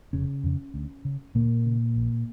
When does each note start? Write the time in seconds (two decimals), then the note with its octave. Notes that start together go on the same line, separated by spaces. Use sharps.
0.13 F1 C#3 C#4
0.43 F2 C#3
0.74 D2
1.05 C#3
1.35 D2 A#2 A#3
1.65 C#3
1.96 A#1